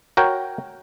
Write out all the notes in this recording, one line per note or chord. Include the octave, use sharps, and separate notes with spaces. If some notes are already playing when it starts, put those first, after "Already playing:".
F#4 A#4 C#5 G5